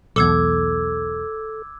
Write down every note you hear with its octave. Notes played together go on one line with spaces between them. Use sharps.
B1 E2 A4 D6 E6 G#6